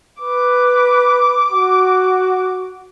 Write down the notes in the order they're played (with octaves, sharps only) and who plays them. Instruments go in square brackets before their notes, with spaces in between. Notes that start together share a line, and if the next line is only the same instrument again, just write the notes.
[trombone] B4 [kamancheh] D6
[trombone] F#4